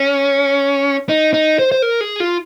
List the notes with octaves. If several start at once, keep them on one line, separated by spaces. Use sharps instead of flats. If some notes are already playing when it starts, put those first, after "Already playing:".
Already playing: C#4
D#4
D#4
C5
C5
A#4
G#4
F4